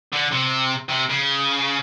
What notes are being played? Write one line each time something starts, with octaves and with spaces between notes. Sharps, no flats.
D3
C3
C3
C#3